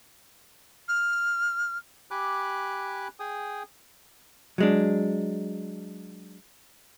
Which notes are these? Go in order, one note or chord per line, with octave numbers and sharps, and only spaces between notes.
F6
G4 G#5 B5 D6 F#6
G#4 G5 G#5 D#6
F#3 G#3 D4